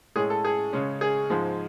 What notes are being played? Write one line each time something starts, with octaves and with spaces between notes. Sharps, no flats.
A2 G#3 C#4 G#4
A4
G#4
C#3 G#3 C#4
G#4
G#2 F3 G#3